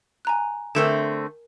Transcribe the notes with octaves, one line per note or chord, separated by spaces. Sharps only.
G#5 A#5 F#6
D3 A3 C4 A#4 E7